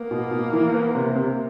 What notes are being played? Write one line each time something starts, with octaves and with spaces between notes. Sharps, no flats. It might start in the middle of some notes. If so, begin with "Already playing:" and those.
Already playing: A#3 B3
B2
B2
E3
B3
C3
C3